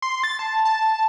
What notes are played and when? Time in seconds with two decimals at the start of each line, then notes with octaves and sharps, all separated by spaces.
0.02 C6
0.23 A6
0.39 A5
0.65 A5